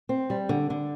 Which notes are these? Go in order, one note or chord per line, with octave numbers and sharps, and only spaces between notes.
C4
G3
D3
D3